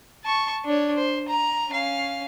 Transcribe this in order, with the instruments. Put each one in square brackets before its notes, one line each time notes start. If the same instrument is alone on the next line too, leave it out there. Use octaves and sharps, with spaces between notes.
[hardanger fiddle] A5 C#6
D4 C#5
C5
A#5
C#4 F5